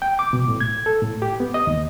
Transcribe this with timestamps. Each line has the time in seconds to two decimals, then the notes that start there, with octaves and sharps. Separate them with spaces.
0.02 G5
0.19 D6
0.33 B2
0.48 A2
0.60 G#6
0.86 A4
1.02 A2
1.22 G4
1.40 B3
1.54 D#5
1.67 D#2